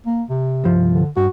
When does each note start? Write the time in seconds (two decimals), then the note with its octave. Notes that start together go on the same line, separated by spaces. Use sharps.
0.06 A#3
0.30 C3
0.64 C2 G2 F3
0.93 D3
1.17 G2 F#4